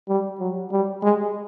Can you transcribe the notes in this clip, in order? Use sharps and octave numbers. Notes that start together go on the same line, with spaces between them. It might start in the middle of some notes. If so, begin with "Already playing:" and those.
G3
F#3
G3
G#3